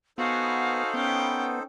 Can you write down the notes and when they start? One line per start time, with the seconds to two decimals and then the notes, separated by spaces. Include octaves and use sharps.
0.18 B3 D#4 F#4 A4 C5 F5 G#5
0.94 B3 C#4 G5